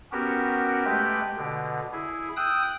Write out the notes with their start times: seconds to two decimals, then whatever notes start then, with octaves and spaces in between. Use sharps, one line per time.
0.12 B3 C#4 F#4 G4 A#4
0.85 G#3 A3 G4 B4 G5
1.37 B2 D3
1.92 E4 G#4
2.36 G5 D#6 E6 F#6